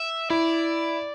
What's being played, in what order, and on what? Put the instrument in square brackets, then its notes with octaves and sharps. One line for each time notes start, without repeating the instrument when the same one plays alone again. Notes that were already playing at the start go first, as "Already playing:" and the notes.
Already playing: [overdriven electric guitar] E5
[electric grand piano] E4 [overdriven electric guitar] D5